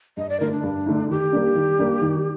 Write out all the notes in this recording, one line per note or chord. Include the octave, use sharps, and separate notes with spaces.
G2 D#5
D5
D3 A3 D#4 A#4
D4
G2
D3 A3 D#4
D#3 G4
G3 A#3 D4
D#3
G3 A#3 D4
D#3